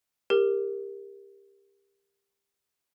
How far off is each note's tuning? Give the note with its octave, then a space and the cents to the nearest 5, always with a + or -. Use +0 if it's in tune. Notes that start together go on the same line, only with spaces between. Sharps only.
G4 +20 A#4 +0